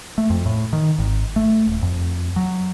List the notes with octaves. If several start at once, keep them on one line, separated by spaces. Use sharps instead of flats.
A3
F2
A2
D#3
G#1
A3
D#1
F2
F#3